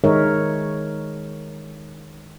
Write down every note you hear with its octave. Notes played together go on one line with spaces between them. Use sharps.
D#3 G#3 D#4 A#4 C#5 E5